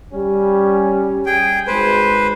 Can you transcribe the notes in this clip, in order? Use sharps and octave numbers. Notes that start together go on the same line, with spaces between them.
G3 C#4
G#4 G5
G#1 G#3 B4 C5